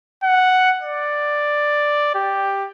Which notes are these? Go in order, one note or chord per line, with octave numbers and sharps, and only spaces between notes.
F#5
D5
G4